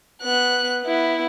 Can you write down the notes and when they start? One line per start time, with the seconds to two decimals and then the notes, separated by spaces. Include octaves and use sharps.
0.23 B3 F#6
0.83 B3 E4